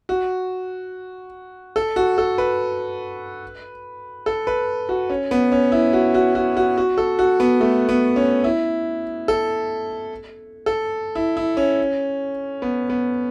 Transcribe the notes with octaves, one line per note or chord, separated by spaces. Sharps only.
F#4
A4
F#4
A4
B4
A4
B4
F#4
C#4
B3
C#4
E4
F#4
F#4
F#4
F#4
F#4
A4
F#4
B3
A3
B3
C#4
E4
A4
A4
E4
E4
C#4
B3
B3